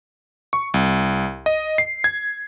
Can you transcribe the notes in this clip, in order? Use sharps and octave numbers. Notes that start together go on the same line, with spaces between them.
C#6
C2
D#5
C7
G#6